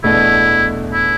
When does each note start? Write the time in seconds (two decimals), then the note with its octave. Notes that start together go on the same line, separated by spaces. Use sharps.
0.04 E2 B2 A3 D4 E4
0.93 E4